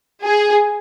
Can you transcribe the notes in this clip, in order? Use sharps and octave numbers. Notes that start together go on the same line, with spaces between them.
G#4